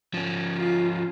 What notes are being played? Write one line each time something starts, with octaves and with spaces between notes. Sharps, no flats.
F3 C#4
F4